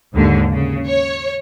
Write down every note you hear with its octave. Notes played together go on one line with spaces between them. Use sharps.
D#2 G#2 D3
C#3
C#5